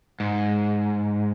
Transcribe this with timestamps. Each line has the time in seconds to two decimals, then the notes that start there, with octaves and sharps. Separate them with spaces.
0.20 G#2